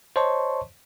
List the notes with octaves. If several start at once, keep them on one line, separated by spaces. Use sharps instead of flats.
C5 C#5 D#5 A5 C6 C#6